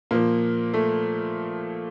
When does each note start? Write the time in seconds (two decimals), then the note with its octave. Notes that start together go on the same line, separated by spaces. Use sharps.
0.11 A#2 F3 A#3
0.74 A3